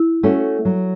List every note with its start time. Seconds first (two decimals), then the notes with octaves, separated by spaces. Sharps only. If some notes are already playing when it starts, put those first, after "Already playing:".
Already playing: E4
0.23 A3 C#4 F#4
0.65 F#3